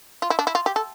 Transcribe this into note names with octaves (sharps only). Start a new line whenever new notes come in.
F4
E4
D4
E4
F4
G4
A4